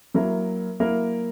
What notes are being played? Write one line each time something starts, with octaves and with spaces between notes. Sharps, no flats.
F#3 A#3 E4 A#4
F#3 A#3 E4 A#4